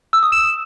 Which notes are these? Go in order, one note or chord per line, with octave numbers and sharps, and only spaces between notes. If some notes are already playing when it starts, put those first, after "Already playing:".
E6
D#6
E7